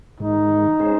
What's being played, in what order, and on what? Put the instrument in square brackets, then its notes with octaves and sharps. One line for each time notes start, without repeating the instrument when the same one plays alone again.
[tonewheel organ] G#2 D#3 G#3 [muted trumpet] D#4
[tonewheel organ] G#3 C#4 G#4 C5